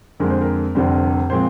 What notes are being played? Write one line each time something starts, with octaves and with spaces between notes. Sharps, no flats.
F2 D3 G#3 C4 A#4
C5
A#4
F1 F2 D3 G3 C4
A#2 F3 G#3 C4 C5